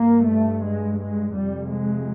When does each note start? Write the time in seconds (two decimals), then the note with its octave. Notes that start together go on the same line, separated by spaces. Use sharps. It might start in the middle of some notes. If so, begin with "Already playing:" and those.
Already playing: G2 A#3
0.29 A3
0.64 G#3
1.00 G#3
1.36 F2 C3 G3
1.72 G#3